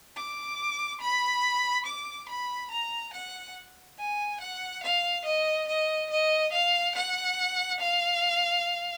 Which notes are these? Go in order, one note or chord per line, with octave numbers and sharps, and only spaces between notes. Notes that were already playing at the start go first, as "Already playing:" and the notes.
D6
B5
D6
B5
A#5
F#5
G#5
F#5
F5
D#5
D#5
D#5
F5
F#5
F5